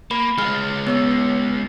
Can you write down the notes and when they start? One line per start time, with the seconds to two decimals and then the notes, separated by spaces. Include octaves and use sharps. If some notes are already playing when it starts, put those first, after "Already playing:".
0.11 A#3 B5
0.38 G#3 F4 F6
0.87 B3 C#5 E6